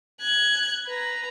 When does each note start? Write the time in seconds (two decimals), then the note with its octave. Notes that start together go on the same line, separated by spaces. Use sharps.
0.21 F#6 G#6
0.87 B4 A#5